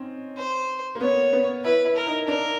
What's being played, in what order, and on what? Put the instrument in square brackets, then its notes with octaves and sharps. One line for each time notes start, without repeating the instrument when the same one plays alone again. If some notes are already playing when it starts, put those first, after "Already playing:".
Already playing: [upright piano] C4 C#4 D#4
[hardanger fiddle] C5
[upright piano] A#3
[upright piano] B3 [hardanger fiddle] C#5
[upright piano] B3
[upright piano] E4 [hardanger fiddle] B4
[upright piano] E4
[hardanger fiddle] A#4
[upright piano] D#4
[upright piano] D4 [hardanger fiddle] A#4